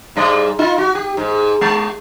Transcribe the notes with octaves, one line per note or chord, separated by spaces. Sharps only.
G#2 G3 D5
D#4 F4
F#4
G4
G#2
G#3